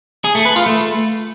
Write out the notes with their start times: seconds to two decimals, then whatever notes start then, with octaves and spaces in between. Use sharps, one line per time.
0.24 G#4
0.35 A3
0.45 B4
0.56 F4
0.66 A3